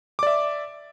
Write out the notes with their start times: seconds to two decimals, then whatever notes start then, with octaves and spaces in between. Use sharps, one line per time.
0.19 D6
0.23 D5
0.27 E5